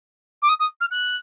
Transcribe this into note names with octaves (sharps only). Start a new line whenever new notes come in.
D6
D#6
D#6
F6
F#6